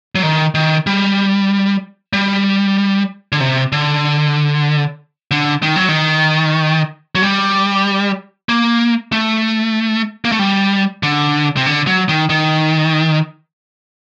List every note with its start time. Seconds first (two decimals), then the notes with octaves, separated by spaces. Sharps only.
0.15 F#3
0.23 D#3
0.55 D#3
0.86 G3
2.13 G3
3.32 D3
3.40 C3
3.72 D3
5.31 D3
5.63 D#3
5.76 F#3
5.88 D#3
7.15 F#3
7.22 G3
8.49 A#3
9.12 A3
10.25 A#3
10.32 A3
10.39 G3
11.03 D3
11.57 C3
11.66 D3
11.87 F#3
12.09 D#3
12.30 D#3